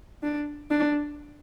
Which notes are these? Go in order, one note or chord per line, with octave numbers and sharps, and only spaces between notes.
D4
D4